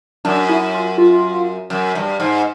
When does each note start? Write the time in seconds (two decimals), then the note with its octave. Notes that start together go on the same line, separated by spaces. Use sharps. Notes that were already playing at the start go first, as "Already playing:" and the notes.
0.25 F#2 D4
0.49 E4
0.74 F4
0.98 F4
1.70 F#2
1.95 G2
2.20 G#2